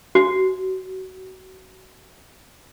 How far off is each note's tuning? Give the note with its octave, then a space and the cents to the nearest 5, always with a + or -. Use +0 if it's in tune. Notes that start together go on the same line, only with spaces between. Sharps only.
F#4 +25